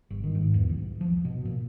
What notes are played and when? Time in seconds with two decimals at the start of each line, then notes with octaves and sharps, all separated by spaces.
0.10 G1
0.24 D#3
0.35 G#2
0.54 E2
0.69 B1
1.01 F3
1.25 B2
1.45 A#2